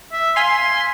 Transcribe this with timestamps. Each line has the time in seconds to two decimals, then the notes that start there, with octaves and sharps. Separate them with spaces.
0.13 E5
0.36 F5 G#5 C6 B6